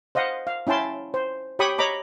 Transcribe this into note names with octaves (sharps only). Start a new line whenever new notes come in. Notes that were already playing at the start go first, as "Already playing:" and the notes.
C5 D#5 F5 F#5
F5
C#4 E4 G5 A5 C6
C5
G4 C#5 G5 B5 C#6 D#6
C#5 D#5 A#5 B5 D6